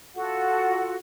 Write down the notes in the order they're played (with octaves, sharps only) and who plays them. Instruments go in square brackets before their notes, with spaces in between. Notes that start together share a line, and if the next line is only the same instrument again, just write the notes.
[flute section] F4 F#4 A4 F#5